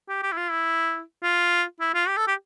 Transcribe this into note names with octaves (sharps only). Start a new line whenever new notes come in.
G4
G4
E4
F4
E4
F4
E4
F4
G4
A4
G4